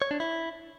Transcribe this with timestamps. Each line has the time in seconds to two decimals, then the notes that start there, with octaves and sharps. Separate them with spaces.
0.02 C#5
0.11 D4
0.20 E4